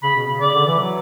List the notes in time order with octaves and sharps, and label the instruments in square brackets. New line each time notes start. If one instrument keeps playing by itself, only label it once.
[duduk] C#3 [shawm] B5
[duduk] B2
C#3
[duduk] C#3 [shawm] D5
[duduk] D3
E3
F#3